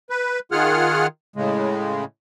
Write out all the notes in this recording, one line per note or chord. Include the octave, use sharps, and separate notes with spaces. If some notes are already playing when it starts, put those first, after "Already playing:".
B4
D#3 F4 G#4 F#5 F6
A2 C#3 G#3